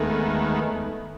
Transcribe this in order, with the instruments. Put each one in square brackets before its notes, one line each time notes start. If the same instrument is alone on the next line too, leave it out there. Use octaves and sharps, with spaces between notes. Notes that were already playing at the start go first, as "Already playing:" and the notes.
Already playing: [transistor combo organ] D#2 D#3 G#3 B3 [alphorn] A3